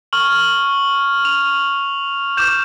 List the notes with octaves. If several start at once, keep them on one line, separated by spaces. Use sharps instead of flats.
C#6 F6 F#7
F7
D6 G6 E7